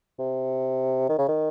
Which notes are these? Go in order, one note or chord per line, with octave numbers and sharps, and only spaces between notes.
C3
D#3
C#3
D#3